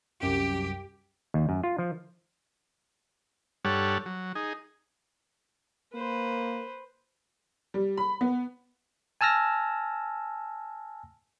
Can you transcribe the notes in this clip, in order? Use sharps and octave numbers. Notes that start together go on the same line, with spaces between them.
C2 F#2 G4
D#2
F#2
F4
F3
G2 G3 A4 C#5 F#5
F#3
D#4 G#4
A#3 B4 C5
G3
B5
B3
G#5 A5 E6 F6 A#6